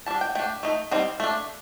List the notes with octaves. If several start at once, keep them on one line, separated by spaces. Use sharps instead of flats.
G3 D4 A5
G5
A3 D4 G5
A3 D#4
G3 C4 D#4 F5
A3 D4